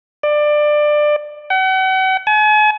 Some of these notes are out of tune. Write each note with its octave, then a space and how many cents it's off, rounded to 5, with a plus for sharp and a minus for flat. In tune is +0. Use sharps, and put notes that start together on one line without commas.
D5 +20
F#5 +40
G#5 +40